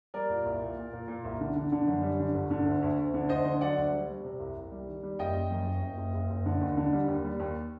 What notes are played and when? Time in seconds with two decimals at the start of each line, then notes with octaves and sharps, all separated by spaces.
0.14 G3 A#4 D5
0.30 A#2
0.45 C2
0.62 A#2
0.77 A#2
0.93 A#2
1.08 A#2
1.24 C2
1.40 D3
1.56 D3
1.72 D3
1.87 F#2
2.03 G3
2.19 D3
2.34 G1
2.51 D3
2.66 D2
2.82 D2
2.98 D2
3.14 D3
3.29 D2 C5 D#5
3.45 D3
3.61 F#3 D5 F#5
3.77 D2
3.92 G3
4.09 G3
4.24 C3
4.40 C2
4.56 C2
4.72 G3
4.88 D#3
5.03 G3
5.19 F#1 D#5 G5
5.35 F#1
5.51 F#2
5.67 F#1
5.82 F#1
5.97 F#1
6.14 F#1
6.30 F#1
6.46 D3
6.61 D#2
6.77 D3
6.93 G3
7.08 D#2
7.25 G3
7.40 D#2